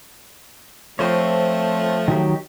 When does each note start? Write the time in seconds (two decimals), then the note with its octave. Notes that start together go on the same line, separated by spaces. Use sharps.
0.99 F3 A3 C4 C5 C#5
2.08 D#3 F#3 G4